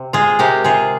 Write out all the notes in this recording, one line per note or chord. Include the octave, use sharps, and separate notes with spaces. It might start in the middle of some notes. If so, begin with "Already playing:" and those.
Already playing: C3
G#3 F4 G#4
C3 G4 A#4
C3 F4 G#4